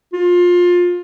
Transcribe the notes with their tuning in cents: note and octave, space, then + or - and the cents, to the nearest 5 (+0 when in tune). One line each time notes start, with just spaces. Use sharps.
F4 +20